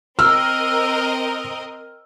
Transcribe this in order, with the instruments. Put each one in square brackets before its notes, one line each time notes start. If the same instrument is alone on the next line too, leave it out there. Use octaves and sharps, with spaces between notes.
[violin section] C4 A#4 D#5 [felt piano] E6 F6